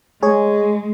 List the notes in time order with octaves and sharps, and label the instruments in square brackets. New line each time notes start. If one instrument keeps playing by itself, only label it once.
[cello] G#3 [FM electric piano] G#4 C#5